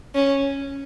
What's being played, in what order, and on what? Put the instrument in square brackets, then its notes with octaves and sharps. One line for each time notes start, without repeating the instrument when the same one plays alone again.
[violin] C#4